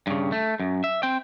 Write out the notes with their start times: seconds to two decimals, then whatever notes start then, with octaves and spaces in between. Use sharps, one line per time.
0.07 G2 C#3
0.32 A3
0.60 F#2
0.84 E5
1.03 C4 G5